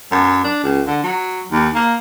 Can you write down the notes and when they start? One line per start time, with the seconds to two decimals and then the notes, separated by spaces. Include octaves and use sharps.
0.12 F#2
0.44 D4
0.63 C#2
0.87 D3
1.03 F#3
1.52 D#2
1.75 A#3